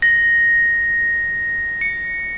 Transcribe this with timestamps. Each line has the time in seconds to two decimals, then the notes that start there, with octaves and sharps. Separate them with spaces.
0.02 A#6
1.81 C#7